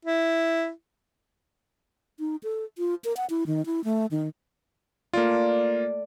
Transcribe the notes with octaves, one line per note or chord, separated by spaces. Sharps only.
E4
D#4
A4
F4
A#4
F#5
E4
D#3
E4
A3
D#3
A3 A#3 F4 D5